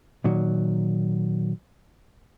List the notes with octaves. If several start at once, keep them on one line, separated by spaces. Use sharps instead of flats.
A#2 D#3 F#3